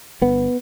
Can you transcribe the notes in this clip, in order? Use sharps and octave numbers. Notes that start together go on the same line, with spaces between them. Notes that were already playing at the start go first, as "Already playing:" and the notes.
G1 B3